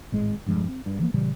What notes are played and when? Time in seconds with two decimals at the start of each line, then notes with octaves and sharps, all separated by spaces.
0.12 G#1 A2 G#3
0.46 E1 G2 F3 G#3
0.68 C4
0.86 G2
0.99 E3 F3 G#3 A#3
1.14 A#2 C#3 E3 G3